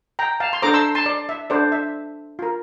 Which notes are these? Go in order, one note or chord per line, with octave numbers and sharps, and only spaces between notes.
G5 A#5
F5 A5
C6
D4 A4 C5 A#5 D6
C6 E6
A5 C6
D5
E5
D4 A4 C5 D5
E5
F4 A#4